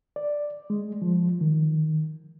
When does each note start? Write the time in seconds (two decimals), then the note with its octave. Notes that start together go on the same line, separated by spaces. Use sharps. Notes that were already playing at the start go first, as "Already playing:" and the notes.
0.16 D5
0.70 G#3
1.02 F3
1.41 D#3